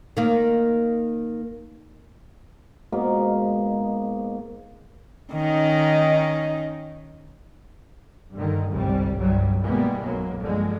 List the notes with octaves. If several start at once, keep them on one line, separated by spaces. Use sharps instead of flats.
D#3 A#3
G#2 B2 A#3
D#3 C#4 D#4
G2 D3 D#3
G1 C2 G#2 C3 G3
C2 G2 F#3 G3
B2 E3 G3 G#3 A#3 B3
B1 F#2 F#3 A#3
G2 D3 F3 G#3